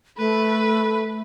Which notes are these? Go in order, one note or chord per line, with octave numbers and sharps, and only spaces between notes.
A3 A4 B4 B5